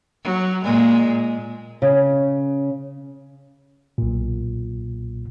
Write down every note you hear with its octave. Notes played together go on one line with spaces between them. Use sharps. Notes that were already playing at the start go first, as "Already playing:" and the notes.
F#3
A#2 G#3
C#3
B1 A#2